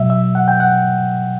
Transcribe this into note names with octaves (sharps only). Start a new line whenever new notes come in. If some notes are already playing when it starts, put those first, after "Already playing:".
Already playing: B2 F#3 E5
E5
F#5
G5
F#5